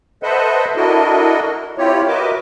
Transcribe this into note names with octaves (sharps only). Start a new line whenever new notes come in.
A4 B4 C5 D#5 E5 F#5
D4 E4 F#4 A4 A#4 D#5
C4 E4 F4 G4 C#5
F#4 A#4 B4 D#5 E5 D6